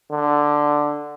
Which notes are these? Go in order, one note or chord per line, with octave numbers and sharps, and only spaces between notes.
D3